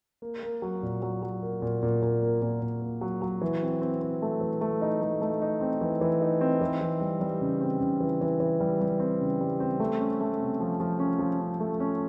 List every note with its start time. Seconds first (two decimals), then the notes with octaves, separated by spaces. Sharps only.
0.22 A#3
0.43 A#3
0.62 F#3
0.83 A#2
1.02 F#3
1.23 F#3
1.43 A#3
1.62 A#2
1.83 A#2
2.02 A#2
2.22 A#3
2.42 A#2
2.62 A#2
2.82 A#3
3.01 F#3
3.22 F#3
3.41 E3
3.62 C4
3.81 C4
4.01 C4
4.22 A3
4.41 E3
4.61 A3
4.82 D#4
5.02 A3
5.21 A3
5.42 D#4
5.61 C4
5.81 E3
6.01 E3
6.22 D#4
6.41 C4
6.61 E3
6.81 E3
7.01 G3
7.21 G3
7.41 C#3
7.61 C4
7.81 C#3
8.00 E3
8.21 E3
8.40 E3
8.60 G3
8.81 G3
9.00 C4
9.21 C#3
9.41 G3
9.60 C4
9.80 A3
10.00 C#4
10.21 A3
10.40 C3
10.61 F3
10.80 F3
10.99 C#4
11.19 F3
11.39 C#4
11.60 A3
11.80 C#4